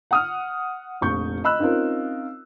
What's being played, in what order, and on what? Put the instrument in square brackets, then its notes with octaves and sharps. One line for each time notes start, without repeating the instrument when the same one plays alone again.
[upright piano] F#5 D#6 F6
F1 A#1 C#6 G6
D#5 B5 E6 F#6
C4 C#4 D#4 F4 A#4